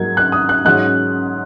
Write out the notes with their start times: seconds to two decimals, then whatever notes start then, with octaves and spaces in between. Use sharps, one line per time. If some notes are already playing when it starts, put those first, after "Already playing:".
Already playing: G#2 F#3 A#3 G#6
0.17 F#6
0.32 D#6
0.49 F#6
0.65 G#2 F#3 C#4 F#6